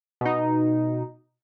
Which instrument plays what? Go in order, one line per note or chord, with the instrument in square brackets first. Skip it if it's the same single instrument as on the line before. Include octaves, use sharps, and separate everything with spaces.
[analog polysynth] B2 D#4